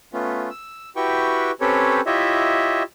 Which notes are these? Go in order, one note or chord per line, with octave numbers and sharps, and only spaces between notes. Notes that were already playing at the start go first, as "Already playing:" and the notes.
A3 B3 C#4 F4
E6
E4 F#4 G4 B4 G5 C#6
C4 C#4 G4 A4 B4 C#5
E4 F4 G4 C#5 D#5 E5